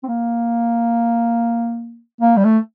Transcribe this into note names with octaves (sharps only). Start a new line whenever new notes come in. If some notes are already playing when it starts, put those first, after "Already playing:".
C4
A#3
A#3
G3
A3